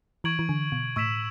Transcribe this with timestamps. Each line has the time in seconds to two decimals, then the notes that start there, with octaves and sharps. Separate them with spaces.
0.24 E3 C#6 G#6 D7 F#7
0.39 E3
0.49 D3
0.72 B2
0.96 A2 C#6 E6 B6 E7